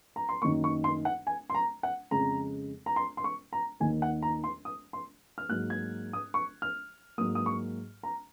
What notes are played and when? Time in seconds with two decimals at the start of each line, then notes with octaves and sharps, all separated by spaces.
0.16 A#5
0.29 C6
0.42 F#2 D#3 A#3 C#6
0.64 C#6
0.84 C6
1.05 F#5
1.27 G#5
1.50 C6
1.55 A#5
1.83 F#5
2.11 F2 C#3 G#3 A#5
2.86 A#5
2.96 C6
3.17 C6
3.24 C#6
3.53 A#5
3.80 D#2 D#3 A#3 G#5
4.02 F#5
4.22 A#5
4.44 C6
4.65 D#6
4.93 C6
5.38 F6
5.49 G#2 F#3 A#3 F#6
5.70 G#6
6.13 D#6
6.34 C#6
6.62 F6
7.18 G#2 F#3 A#3 D#6
7.35 D#6
7.46 C#6
8.03 A#5